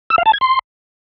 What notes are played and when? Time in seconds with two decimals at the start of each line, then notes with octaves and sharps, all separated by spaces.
0.10 E6
0.18 F5
0.26 A5
0.33 G#6
0.41 C6